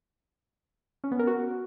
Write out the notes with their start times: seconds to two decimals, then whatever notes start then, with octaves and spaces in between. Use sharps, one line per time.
1.04 C#4
1.11 B3
1.19 A#4
1.27 F#4